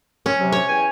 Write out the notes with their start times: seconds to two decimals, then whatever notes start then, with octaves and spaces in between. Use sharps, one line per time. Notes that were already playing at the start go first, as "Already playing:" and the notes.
0.26 C#4
0.39 C3 F#3
0.52 C#5
0.69 E2 G5 G#5